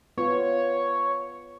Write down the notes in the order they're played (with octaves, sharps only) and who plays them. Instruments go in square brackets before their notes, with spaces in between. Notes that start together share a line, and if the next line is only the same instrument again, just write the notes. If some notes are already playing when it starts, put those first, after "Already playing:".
[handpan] B3 F4 [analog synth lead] C#5